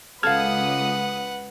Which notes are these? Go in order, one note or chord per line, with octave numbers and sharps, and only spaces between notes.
C#2 A4 B4 F5 F#5 D#6 F6 G#6